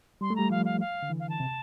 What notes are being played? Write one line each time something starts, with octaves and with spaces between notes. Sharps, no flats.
G3 C6
A3
G3 A#5
F3 F5
F5
F5
D3
E3
F5
A5
C3